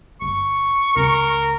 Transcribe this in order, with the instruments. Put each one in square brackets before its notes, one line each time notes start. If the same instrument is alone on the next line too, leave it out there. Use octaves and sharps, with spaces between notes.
[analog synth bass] G1 [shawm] C#6
[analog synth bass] C#2 [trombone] A#4